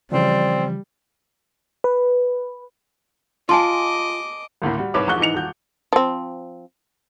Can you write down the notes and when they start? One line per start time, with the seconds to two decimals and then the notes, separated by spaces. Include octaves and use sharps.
0.12 C#3 E3 F3 G3 C4 D5
1.84 B4
3.49 F4 D#5 G#5 A5 C6 D6
4.62 G#1 D2 A2 A#3
4.78 G3 F#4
4.94 C2 G#2 B4 C#5 D6
5.07 E1 A#1 G#2 C#6 F#6 G7
5.19 G#2 E3 D#4 C#7 F7
5.34 D#1 F#4 G6
5.93 F3 C4